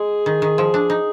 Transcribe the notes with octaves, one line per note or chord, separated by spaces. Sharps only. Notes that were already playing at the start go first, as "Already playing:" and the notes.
Already playing: G#3 G#4
D#3
D#3
F3
D4
D#4